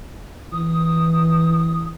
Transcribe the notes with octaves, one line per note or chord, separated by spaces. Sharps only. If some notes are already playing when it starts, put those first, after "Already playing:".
E3 D#6